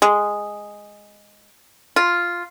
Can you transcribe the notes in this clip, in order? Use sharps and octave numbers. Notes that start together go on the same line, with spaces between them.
G#3
F4